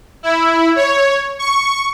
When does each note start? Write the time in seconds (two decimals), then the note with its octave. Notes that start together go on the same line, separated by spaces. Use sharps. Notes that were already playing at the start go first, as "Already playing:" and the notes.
0.23 E4
0.76 C#5
1.39 C#6